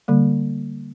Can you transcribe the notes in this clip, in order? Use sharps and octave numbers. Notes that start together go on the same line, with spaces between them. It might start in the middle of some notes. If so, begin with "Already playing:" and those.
D3 G3 A#3